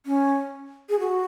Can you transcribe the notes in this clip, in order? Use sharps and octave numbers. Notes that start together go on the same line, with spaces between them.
C#4
G#4
F#4